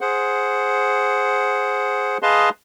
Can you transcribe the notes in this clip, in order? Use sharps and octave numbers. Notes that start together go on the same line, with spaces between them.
G#4 C5 F#5
G#4 B4 D#5 F5 A5 C6